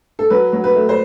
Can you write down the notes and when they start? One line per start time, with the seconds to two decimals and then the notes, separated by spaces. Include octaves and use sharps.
0.19 A4
0.30 F#3 B4
0.53 F#3
0.64 B4
0.75 A3
0.89 C5